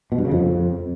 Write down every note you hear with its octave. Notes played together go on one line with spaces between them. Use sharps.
B2
G2
C#3
F2